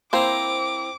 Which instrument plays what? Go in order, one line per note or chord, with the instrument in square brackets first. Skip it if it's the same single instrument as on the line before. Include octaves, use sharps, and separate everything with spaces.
[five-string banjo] A#3 C5 [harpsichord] C4 E4 A#5 [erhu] D6